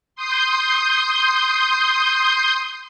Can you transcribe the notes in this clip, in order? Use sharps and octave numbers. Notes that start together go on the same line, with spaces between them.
C6 D#6 G6